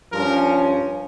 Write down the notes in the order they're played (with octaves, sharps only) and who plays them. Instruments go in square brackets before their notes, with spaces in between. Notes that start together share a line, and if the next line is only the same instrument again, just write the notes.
[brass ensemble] G2 F3 C#4 A#4